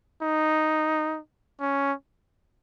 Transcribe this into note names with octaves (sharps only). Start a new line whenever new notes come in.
D#4
C#4